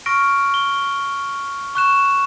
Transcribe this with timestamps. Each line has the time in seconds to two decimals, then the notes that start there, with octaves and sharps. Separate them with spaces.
0.06 C#6 F6 A#6 D7
0.54 G7
1.75 C#6 F#6 E7